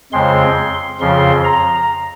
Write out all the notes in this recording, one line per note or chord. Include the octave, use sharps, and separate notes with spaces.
F2 C#3 G#3 C4 C6
F2 C#3 F3 C6
A#5